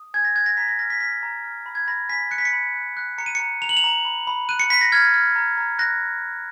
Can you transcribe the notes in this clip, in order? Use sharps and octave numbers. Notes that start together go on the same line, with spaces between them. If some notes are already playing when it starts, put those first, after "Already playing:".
Already playing: D#6
G#5 G#6
A#6
F#6 G#6
A#6
A#5 B6
A#6
F6 A#6
B6
F6 B6
A#5
F6
B5
G#6
B5 A#6
G#5 B6
F#6 C#7
B6
C#7
B5
F#6
F#6
A#5 C#7
D#7
A#5 C#7
A#5 F7
F#7
F7
A#5
B5
B5
F#6 D#7
C#7
B5 B6
A#6
F6 G#6
F6
A#5
A#5
F#6 A#6